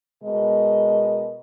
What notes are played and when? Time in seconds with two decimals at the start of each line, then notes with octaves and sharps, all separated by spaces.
0.23 B2 G#3 A#4 D#5